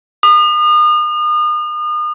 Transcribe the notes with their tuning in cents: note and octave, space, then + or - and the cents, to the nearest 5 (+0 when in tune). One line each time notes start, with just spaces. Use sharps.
D#6 -35